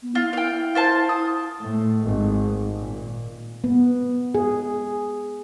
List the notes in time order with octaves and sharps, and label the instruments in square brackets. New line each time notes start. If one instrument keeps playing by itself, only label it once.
[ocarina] B3
[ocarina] E4 [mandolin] F4
[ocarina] E4 [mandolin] F5 G5
[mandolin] F4 C5 A5
D#6
[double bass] A2
G#1
A#2
[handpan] B3
G#4